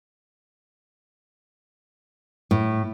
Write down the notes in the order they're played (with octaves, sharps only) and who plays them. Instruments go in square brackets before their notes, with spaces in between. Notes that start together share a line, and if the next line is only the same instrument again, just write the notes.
[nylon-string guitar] A2